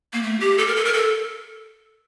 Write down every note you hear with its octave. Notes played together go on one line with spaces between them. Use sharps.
A#3
A3
G4
A4
A#4
A4
A#4
A4